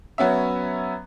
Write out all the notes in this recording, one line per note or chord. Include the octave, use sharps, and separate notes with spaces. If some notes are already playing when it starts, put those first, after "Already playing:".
F#3 B3 C#4 E5